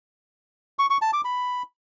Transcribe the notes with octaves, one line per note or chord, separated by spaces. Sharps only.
C#6
C#6
A5
D6
B5